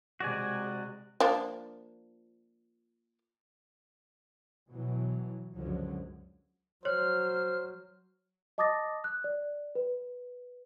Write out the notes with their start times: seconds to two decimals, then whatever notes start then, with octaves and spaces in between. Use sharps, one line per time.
0.20 C3 G#3 F#4 D5 G#5
1.20 F3 A#3 D4
4.70 B2 E3 F#3
5.56 C#2 F#2 D3 F3 F#3
6.85 F#3 C5 C#5 F6
8.58 D#5 A5 D6 D#6 A6 A#6
9.04 F#6
9.24 D5
9.75 B4